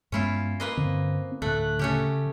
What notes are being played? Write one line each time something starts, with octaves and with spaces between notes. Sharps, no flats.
G2 G#3 B3 C#4 E4 F4
A#3 B4 D#5 C6
G2 D3 C4
D2 A2 A3 F#6
C#3 A3 C#4 G4